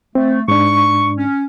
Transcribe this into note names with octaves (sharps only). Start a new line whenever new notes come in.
A3 C4
G#2 D4 C#6
C#4